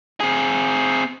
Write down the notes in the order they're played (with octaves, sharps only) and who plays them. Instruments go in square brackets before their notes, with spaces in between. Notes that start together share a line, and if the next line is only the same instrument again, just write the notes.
[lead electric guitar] C4 G#4